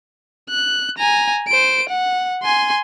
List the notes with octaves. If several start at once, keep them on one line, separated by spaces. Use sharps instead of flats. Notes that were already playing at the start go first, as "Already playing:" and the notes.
F#6
G#5 A#5
C5 D7
F#5
G#5 C6